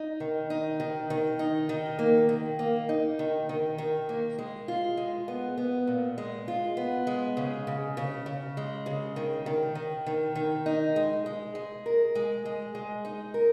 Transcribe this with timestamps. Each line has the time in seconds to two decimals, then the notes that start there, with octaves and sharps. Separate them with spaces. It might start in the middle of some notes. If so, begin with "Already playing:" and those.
Already playing: D#4
0.20 D#3
0.50 D#4
0.80 D#3
1.10 D#3
1.39 D#4
1.69 D#3
1.99 A#3
2.29 D#3
2.59 A#3
2.89 D#4
3.19 D#3
3.49 D#3
3.78 D#3
4.09 A#3
4.39 G#3
4.68 F4
4.97 G#3
5.28 B3
5.57 B3
5.87 A#2
6.18 G#3
6.48 F4
6.77 B3
7.07 G#3
7.37 C#3
7.67 C#3
7.97 C#3
8.26 C#3
8.57 G#3
8.86 C#3
9.16 D#3
9.46 D#3
9.75 D#3
10.06 D#3
10.35 D#3
10.66 D#4
10.96 G#3
11.26 G#3
11.55 G#3
11.86 A#4
12.15 G#3
12.45 G#3
12.75 G#3
13.05 D#4
13.34 A#4